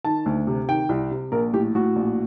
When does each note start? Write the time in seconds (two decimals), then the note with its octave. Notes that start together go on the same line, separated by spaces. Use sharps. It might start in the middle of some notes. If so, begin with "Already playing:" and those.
0.05 D#3 A5
0.26 D2
0.47 C3
0.69 D#3 G5
0.89 C2
1.11 C3
1.32 A#1 A#4
1.53 A2 G4
1.75 A2 F#4
1.96 A#1